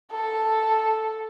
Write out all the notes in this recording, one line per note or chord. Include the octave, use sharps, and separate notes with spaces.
A4